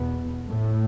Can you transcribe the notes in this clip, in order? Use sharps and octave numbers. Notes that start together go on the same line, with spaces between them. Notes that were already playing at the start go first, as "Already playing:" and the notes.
Already playing: E2 B2 B3
A2 A3